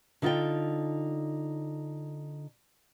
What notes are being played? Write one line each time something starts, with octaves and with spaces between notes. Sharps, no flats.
D3 D#4 F4 A4 G5